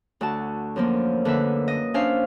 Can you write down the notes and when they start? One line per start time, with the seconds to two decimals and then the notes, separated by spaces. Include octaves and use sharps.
0.21 D2 F#4 A5
0.76 F#2 F3 A#3
1.25 D3 A#3 B4 E5
1.68 D#5
1.94 C#4 D4 C5 E5 F5